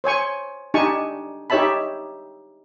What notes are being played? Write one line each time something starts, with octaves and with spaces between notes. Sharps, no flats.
C5 C#5 G#5 C#6
D4 D#4 G4 G#5 A5 C#6
D#4 G4 C#5 E5 A5 B5